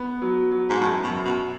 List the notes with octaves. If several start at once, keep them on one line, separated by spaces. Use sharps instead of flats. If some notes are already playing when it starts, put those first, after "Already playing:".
Already playing: B3
F#3
F#3
G#2
F#2 A2
B2
F#2
B2